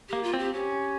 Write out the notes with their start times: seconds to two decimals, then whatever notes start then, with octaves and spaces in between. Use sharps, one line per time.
0.09 A#3 G4
0.23 F4
0.33 C4
0.39 G4
0.54 C#4 G4